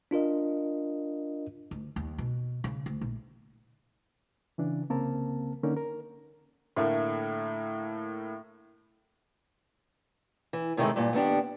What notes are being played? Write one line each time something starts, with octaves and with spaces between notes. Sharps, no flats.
D4 F4 A#4 D#5
D2
D#2
B2
C#3
D2
A#1
C#3 E3 D4
C2 C#3 A#3 C4 A#4 A5
D3 A#3 C#4 D#4 A#4
A#4
A2 D3 A3 A#3
E3
A2 C3 D#3 E3 G#3 A3
G2 A#2
D#2 B3 D4 G4